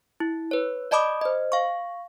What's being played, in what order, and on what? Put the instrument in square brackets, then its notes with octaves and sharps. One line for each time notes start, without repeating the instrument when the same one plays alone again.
[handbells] E4
B4 C#5
D5 D#5 A5 B5 D6 D#6
C5 D#5
F5 C#6